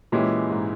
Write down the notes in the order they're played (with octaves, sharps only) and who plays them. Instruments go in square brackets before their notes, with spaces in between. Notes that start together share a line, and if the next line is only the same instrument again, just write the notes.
[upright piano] A#2 [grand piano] E3 G#3 C#4 E4 G4
[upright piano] G#2